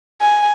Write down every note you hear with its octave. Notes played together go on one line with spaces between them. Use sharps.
G#5